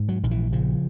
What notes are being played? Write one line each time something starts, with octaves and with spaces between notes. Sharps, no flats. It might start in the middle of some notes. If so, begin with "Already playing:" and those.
Already playing: G#2
F#3
A#1 D#3
E3
C#3 F3